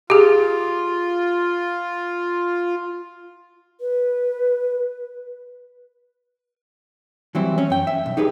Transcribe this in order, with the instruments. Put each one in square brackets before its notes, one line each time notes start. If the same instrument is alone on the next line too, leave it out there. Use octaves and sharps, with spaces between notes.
[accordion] F4 [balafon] G4 G#4
[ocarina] B4
[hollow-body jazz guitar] E3 F#3 G3 C4 E4
C#4 C#5
F#2 G5
E5
B1
D#4 G4 G#4 B4